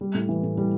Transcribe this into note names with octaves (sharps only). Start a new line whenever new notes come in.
G3
A2
E3
A2
G3